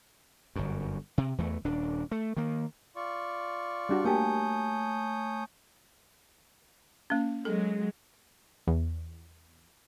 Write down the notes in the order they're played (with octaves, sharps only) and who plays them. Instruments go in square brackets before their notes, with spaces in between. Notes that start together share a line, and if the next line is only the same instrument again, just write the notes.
[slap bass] G1 F#2
C3
E2 E3 A3
D#1 D4
A3
D#3 A#3
[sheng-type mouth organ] F4 D5 C#6
[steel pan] G3 D4 F#4
[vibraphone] A3 G#5 A5 [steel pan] A#3 G4 [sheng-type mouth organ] C#5 D#6 G6
[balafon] A#3 C#4
[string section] F#3 G#3 [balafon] A4
[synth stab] E2